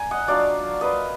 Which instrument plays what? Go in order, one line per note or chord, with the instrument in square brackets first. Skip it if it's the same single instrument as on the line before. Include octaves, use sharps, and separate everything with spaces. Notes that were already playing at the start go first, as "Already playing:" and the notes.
Already playing: [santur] G#5 A#5
D#5 F#5
F#3 D4 F4 D5 F5
A#3 F4 B4 D#5